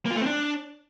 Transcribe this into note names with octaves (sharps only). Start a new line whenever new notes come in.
A#3
F4
A3
C4
D4